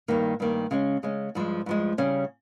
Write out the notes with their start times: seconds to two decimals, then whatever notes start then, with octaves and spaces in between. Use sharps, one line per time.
0.08 G2 D#3 A#3
0.40 G2 D#3 A#3
0.71 C#3 G#3 C#4
1.03 C#3 G#3 C#4
1.35 G2 F3 G#3
1.66 G2 F3 G#3
1.98 C#3 G3 C#4